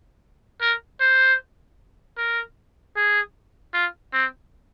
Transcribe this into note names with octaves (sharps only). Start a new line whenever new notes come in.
A#4
C5
A#4
G#4
F4
C4